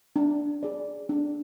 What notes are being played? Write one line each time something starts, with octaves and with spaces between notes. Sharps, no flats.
D4
G#4 D5
D4